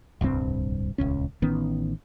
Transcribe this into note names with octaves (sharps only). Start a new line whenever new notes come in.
D1 C2 G2 C4
D#1 C#2 C#4
A1 D#3 B3 C#4